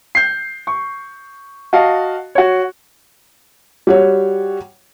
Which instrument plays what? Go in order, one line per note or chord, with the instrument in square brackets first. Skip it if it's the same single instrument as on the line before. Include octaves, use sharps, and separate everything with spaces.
[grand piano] G6 C7
C#6
F#4 D#5 F5 A5
F#4 C#5
[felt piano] G3 F#4 C#5